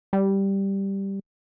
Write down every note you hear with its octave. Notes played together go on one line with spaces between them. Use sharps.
G3